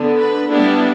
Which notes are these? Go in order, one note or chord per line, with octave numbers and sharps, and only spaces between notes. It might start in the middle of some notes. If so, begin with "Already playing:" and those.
Already playing: D3 B3 D4
B4
G3 B3 D4 E4